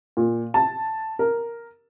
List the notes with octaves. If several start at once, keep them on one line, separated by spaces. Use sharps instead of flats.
A#2
A5
A#4